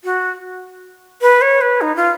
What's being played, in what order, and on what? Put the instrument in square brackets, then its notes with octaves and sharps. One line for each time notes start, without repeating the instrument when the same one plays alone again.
[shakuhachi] F#4
B4
C#5
B4
D#4
F4